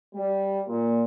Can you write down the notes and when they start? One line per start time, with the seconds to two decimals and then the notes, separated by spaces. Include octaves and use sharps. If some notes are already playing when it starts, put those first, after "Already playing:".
0.14 G3
0.67 A#2